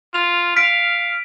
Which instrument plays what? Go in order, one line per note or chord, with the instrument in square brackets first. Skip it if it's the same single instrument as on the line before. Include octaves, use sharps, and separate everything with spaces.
[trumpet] F4 [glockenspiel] F7
[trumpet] F5 [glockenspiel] B6 D7